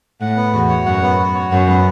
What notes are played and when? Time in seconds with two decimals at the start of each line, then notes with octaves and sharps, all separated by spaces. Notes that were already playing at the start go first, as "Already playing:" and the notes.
0.21 A2 F#5
0.36 B3
0.53 E2 F#4
0.69 C#5
0.85 F#2 F#5
1.02 B3
1.18 F#4
1.34 C#5
1.51 F#2 F#5
1.68 B3